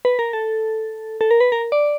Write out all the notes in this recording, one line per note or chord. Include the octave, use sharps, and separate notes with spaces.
B4
A#4
A4
A4
A#4
B4
A#4
D5